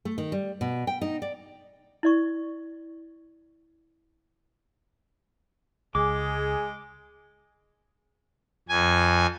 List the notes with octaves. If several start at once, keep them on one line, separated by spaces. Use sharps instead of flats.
A3
D#3
G3
B2
G5
D#4
D5
E4 D5 C#6
C#2 G#3 G#4 D6
F2 G#5